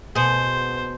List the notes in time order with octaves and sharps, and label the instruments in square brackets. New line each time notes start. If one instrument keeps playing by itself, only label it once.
[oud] B2 G#4 [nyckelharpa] C5